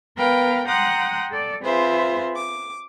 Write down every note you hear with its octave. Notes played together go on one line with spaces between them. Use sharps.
B3 A#4 B4 F5 G5
F#5 G5 A#5 C6 D#6 F#6
A4 D5
C4 F4 G#4 B4 C5 E5
D6